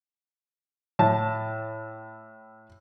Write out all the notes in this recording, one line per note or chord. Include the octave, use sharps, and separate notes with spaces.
A2 A5